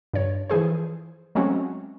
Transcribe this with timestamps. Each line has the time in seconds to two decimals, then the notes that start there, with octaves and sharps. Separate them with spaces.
0.14 G2 C#5
0.50 E3 F3 G#4 C5
1.35 F#3 G#3 A3 C4 C#4 F#4